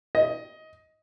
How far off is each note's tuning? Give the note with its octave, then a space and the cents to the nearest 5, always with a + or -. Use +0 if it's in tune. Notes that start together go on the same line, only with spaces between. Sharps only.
D#5 +15